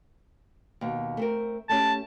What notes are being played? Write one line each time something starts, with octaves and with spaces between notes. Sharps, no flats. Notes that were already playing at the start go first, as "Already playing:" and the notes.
D#2 B2
A3 C4 A#4
A3 C#4 G4 A5